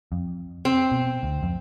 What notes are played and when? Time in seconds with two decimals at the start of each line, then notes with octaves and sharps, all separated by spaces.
0.12 F2
0.65 C4
0.91 B2
1.23 D2
1.43 F2